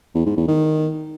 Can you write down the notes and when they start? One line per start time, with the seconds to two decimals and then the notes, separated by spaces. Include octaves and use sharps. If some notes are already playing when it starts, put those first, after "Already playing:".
0.15 E2
0.26 G#2
0.37 E2
0.48 D#3